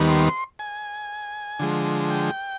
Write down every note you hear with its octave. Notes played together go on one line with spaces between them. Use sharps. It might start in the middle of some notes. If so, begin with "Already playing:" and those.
Already playing: D#2 D#3 G3 B3
C6
G#5
D3 F3 G#3
G5